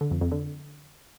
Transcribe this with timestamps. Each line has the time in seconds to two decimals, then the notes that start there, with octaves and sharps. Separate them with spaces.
0.01 D3
0.11 F2
0.21 F2
0.32 D3